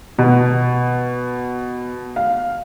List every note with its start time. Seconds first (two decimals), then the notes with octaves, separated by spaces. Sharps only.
0.18 B2
2.16 F5